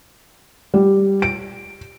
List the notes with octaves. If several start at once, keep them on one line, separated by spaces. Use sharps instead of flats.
G3
D7